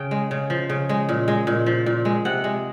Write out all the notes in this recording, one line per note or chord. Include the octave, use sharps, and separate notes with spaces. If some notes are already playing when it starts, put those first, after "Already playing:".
Already playing: C#3 G5
G#3
C#3
F3
C#3
G#3
A#2
G#3
A#2
F3
A#2
G#3
C3 F#5
G#3